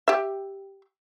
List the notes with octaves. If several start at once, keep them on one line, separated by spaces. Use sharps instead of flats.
G4 E5